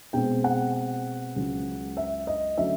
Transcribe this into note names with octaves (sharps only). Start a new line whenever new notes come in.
B2 G#3 C4 G5
F#5
C#2 C#3 F#3
E5
D#5
D3 F#3 A3 C#4 E5